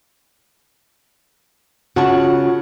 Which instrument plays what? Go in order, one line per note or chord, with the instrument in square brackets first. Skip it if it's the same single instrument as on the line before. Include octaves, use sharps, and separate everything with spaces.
[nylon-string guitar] C#3 [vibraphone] F4 [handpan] F#4 [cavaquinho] F#5 A5 C#6